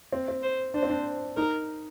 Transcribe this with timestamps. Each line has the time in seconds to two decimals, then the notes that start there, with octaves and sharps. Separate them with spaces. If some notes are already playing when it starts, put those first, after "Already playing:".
0.13 C4
0.28 C4
0.43 C5
0.74 D4 C5
0.83 C4
0.90 D4
1.37 D#4 A#4